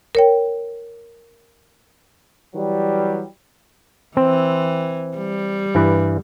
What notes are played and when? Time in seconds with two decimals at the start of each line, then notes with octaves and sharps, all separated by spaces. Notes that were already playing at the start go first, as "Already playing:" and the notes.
0.15 A#4 C#5 G5
2.55 E3 F#3 G3
4.17 E3 C4
5.17 G3
5.75 G2 E3 B4